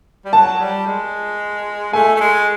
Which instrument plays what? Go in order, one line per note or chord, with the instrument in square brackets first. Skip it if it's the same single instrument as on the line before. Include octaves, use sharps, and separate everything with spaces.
[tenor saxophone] G3
[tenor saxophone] F#3 [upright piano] A5
[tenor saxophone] G3
G#3
[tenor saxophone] A3 [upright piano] G#5
[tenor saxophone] A3
G#3